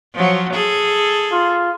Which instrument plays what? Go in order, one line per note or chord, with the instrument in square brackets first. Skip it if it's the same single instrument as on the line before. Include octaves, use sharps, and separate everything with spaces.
[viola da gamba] F3 F#3
G#4 A4
[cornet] F4